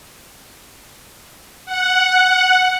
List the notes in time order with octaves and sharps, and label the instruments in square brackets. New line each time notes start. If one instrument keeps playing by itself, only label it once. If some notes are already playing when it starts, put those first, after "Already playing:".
[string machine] F#5